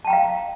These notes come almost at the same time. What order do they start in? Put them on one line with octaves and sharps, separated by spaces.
A5 G5 A#5 F5